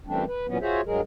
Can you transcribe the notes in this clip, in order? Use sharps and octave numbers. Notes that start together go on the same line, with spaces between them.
F#2 E3 G3 A3 C4 D4
B4
A#2 E3 F#3 B3 C#4
F4 F#4 G#4 C5 C#5 E5
G2 F#3 G#3 G#4 A#4